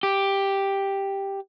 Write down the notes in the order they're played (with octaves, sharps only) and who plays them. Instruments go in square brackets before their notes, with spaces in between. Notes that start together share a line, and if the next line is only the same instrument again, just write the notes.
[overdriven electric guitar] G4